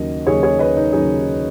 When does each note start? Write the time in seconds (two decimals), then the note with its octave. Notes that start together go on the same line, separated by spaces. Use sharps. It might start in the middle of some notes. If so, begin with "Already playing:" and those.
Already playing: D#2 C#3 F#3 D#5
0.27 D#2 C#3 F#3 G#4 C#5
0.43 G#4 C#5
0.59 B4 D#5
0.76 D#4
0.93 D#2 C#3 F#3 D#4 G#4